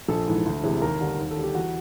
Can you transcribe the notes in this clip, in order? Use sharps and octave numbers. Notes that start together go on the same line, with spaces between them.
A#1 A4
G#2 E3
D2
C3 E3 G#3
D#2 A#4
D3 G3
D#2
A4
D3 G3
G4
E2 F#4